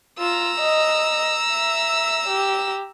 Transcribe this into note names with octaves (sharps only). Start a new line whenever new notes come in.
F4 A#5 E6
D#5
E5
G4